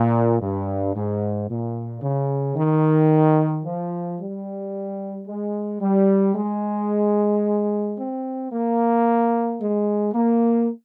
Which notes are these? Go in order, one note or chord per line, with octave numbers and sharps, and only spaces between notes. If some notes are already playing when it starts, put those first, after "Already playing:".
Already playing: A#2
G2
G#2
A#2
C#3
D#3
F3
G3
G#3
G3
G#3
C4
A#3
G#3
A#3